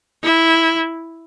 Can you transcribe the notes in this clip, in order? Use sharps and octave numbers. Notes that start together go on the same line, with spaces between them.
E4